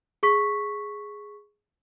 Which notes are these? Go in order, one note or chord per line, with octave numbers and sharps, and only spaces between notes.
G#4 C#6 B6